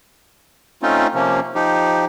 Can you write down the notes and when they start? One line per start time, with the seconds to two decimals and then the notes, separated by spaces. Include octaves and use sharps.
0.82 A3 C4 C#4 D#4 F4
1.15 C3 F3 A#3 C#4
1.55 F3 D#4 G4